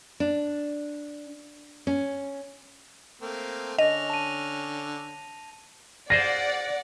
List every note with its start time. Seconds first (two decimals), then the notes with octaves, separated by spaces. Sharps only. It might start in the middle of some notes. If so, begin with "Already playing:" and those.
0.20 D4
1.87 C#4
3.22 A3 A#3 C4
3.79 D3 C#4 D#5 A#6 F7
4.10 A5 D#7
6.10 F4 G#4 C5 D5 F#5 A#6